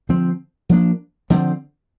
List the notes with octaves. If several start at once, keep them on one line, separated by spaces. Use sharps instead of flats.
D3 F3 C4
F3 A#3 D4
D3 F3 C4